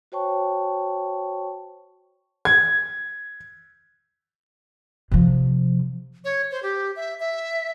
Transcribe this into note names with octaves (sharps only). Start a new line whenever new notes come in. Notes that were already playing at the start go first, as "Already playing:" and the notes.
F#4 C5 C#5 G5 A5 C#6
G#6
C3 F3
C#5
C5
G4
E5
E5